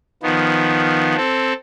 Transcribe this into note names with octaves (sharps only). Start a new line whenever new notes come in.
D#3 F3 B3
C4 A4